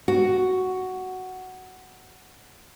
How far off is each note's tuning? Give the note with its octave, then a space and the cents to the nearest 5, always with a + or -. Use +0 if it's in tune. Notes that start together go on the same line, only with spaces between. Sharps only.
F#4 +5